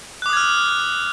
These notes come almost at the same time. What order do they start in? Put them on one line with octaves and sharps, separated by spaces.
F#6 D6 D#6 G#6 F6